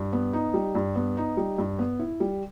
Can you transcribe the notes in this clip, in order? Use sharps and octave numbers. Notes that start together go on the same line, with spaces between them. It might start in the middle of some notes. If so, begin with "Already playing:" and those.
Already playing: G2
B3
D#4
G3
G2
B3
D#4
G3
G2
B3
E4
G3